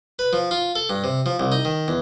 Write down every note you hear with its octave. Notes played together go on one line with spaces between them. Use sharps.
B4
F3
F4
A4
G2
C3
F3
C2
D#4
D#3
E2